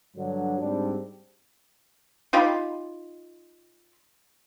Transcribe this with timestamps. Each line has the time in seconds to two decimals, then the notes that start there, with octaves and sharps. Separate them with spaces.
0.15 G2 D3 F#3
0.60 G#2 G3 C4 D4
2.33 D#4 F4 G4 B5